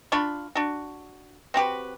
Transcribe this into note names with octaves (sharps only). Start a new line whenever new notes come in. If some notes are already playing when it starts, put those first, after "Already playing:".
D4 F4 B5 C#6
D4 F#4
C4 F#4 G4 B4